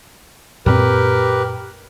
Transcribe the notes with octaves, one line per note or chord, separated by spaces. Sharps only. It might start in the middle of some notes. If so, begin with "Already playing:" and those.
F#2 A#2 C4 G4 A#4 B4